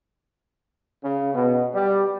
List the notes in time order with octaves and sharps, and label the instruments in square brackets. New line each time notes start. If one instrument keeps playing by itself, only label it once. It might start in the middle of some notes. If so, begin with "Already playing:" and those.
[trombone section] C#3
B2
G3